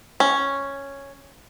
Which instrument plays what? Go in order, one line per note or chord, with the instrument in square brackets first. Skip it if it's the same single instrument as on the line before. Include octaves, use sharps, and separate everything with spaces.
[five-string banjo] C#4